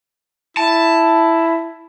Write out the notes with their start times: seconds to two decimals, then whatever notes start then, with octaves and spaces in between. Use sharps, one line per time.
0.57 E4 A5